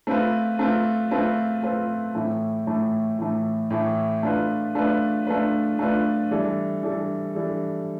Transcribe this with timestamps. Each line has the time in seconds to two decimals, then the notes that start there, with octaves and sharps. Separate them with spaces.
0.07 A3 C4 F4 B4
0.59 A3 C4 F4 B4
1.11 A3 C4 F4 B4
1.63 A3 C4 F4 B4
2.15 A2 E3 A3
2.67 A2 E3 A3
3.19 A2 E3 A3
3.71 A2 E3 A3
4.23 A3 D4 F4 B4
4.75 A3 D4 F4 B4
5.27 A3 D4 F4 B4
5.79 A3 D4 F4 B4
6.31 E3 G3 D4 A4
6.83 E3 G3 D4 A4
7.35 E3 G3 D4 A4